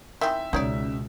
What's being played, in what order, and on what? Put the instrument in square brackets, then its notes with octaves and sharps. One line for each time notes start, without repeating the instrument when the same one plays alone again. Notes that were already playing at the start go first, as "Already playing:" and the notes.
[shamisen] D#3 E3 C4 [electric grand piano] E5
[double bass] C#2 B2 [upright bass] C#4 [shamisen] D#4 C#5 D5